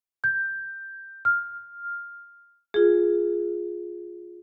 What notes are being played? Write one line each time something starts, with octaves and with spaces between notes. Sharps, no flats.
G6
F6
F4 G#4